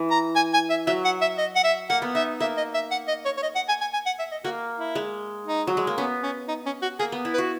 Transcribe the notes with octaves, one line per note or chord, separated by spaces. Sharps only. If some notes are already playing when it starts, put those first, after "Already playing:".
Already playing: E3
A#5
G#5
G#5
E5
F#3 E5
F#5
E5
D#5
F#5
E5
A#3 F#5
B3
D#4 E5
A#3 E5
D#5
E5
F#5
D#5
C#5
C#5
D#5
F#5
G#5
G#5
G#5
F#5
E5
D#5
A#3 F#4
E4
G#3
D#4
F#3
G#3
A#3
B3 C#4
C#4
D#4
C#4
F#4
A#3 G#4
B3
E4
B4
F#4